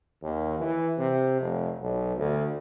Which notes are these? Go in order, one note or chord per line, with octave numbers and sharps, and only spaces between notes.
D#2
E3
C3
F1
B1
D2